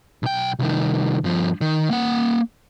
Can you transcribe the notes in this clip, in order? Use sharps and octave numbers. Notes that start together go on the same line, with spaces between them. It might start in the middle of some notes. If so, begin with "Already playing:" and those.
B1 G5
C2 D#3
G2 F3
D#3
A#3 F#5